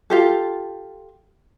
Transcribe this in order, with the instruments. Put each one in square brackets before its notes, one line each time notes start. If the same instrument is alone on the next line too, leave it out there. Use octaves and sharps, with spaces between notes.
[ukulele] F4 G4 A4